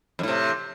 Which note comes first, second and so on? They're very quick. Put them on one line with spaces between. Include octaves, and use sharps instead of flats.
F2 A2 C3